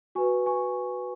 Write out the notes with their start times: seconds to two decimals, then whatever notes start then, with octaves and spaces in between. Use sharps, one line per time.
0.15 F#4 B4 G#5 C#6
0.46 G#5 C#6